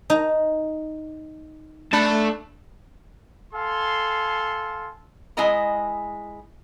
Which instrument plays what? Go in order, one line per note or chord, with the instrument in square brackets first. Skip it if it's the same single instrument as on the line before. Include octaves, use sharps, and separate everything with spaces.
[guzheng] D#4 A#5
[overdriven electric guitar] A3 A5 [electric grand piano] D4 B5
[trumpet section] A4 F5 G#5 C6
[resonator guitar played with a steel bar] G#3 E4 D#5 G#5 A#5